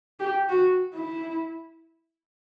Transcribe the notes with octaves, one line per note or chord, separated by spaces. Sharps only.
G4
F#4
E4